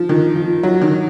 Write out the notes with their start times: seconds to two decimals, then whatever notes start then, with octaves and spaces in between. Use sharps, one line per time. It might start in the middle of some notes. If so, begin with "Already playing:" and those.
Already playing: F3
0.09 D#3
0.36 F3
0.63 F#3
0.82 D#3